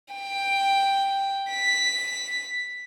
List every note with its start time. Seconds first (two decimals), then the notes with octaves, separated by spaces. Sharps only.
0.14 G5
1.50 B6